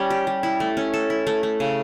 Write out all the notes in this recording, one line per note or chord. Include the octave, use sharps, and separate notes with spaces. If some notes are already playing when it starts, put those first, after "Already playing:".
Already playing: G3 C#4
G4
G3
E4
A3
C#4
A4
E4
A3
A3
C#3